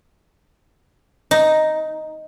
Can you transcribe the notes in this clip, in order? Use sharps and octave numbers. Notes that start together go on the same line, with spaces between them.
D#4